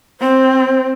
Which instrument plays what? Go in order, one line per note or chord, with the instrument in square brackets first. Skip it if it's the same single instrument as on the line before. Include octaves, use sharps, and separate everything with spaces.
[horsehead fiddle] C4 [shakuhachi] C5